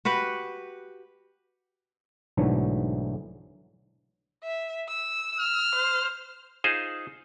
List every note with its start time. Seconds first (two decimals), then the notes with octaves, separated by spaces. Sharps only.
0.05 F#4 G4 B4
2.37 B1 G#2 D3 E3 F#3 A3
4.43 E5
4.88 E6
5.40 F6
5.75 C5
6.64 D#4 F4 G#4 C5